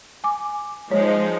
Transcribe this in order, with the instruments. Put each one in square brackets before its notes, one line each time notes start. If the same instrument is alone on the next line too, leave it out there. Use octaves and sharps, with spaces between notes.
[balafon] G#5 D6
[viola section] F3 G#3 D#4 [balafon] C#5